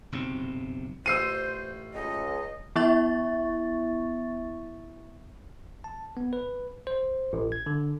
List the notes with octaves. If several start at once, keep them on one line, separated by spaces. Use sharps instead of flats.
F#1 B1 C3 C4
A1 F4 C5 E6 C7 D#7
C#2 D#5
E3 B3 E4 E5 C#6 A6
A5
B3
B4
C5
A1
G#6
D3